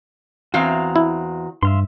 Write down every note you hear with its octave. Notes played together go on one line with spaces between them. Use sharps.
E2 C4 F#4 F5 A#5
E4
G2 E5 F5 C6